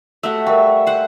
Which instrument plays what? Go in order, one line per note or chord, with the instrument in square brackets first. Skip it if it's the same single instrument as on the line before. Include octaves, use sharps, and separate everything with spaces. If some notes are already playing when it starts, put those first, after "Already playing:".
[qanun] A3 F#4 G4 [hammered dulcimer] E5 F#5
[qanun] G3 [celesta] A#4 E5 G5 [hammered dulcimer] C#6
[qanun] C5 F#5